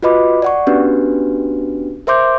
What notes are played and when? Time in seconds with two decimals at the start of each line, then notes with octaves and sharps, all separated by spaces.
0.03 F4 F#4 B4 D#5 B5 D6
0.42 D5 F#5 C#6
0.67 B3 C#4 D4 F#4 G4 B4
2.07 A#4 C5 E5 C6 D6 G6